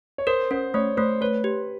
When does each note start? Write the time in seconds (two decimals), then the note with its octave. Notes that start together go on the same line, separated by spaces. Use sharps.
0.18 C#5
0.27 A#4 C5
0.51 C#4 C5
0.74 A3 C#5
0.97 A3 C5
1.21 B4 C#5
1.44 G4